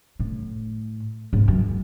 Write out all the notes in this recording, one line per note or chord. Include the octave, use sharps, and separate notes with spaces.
A2
G#2
F#2